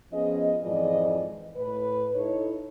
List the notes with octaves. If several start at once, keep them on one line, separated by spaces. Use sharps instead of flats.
F3 B3 C#4 G#4 D#5
F2 G#2 E3 G#4 D5 D#5
A2 B4
D#4 E4 A4 C#5